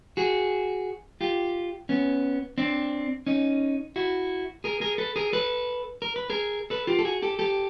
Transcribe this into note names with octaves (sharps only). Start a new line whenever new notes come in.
F#4 G#4
F4 G4
B3 C#4
C4 D4
C#4 D#4
E4 F#4
G#4 A#4
G#4 A#4
A4 B4
G#4 A#4
A4 B4
A#4
B4
G#4 A#4
A4 B4
F4 G4
A4
F#4 G#4
G4 A4
G4 A4